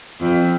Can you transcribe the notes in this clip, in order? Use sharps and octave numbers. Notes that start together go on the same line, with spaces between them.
F2